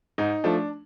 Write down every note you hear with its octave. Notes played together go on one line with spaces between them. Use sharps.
G#2 D#4
F3 A3 D4